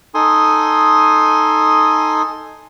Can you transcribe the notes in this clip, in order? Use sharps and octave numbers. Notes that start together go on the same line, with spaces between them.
D#4 A4 G#5 C6 D#6